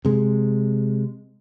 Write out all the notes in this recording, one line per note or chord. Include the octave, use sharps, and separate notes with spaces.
C3 G#3